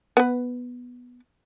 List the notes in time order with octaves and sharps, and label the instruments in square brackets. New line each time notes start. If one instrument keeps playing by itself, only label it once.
[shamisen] B3 B4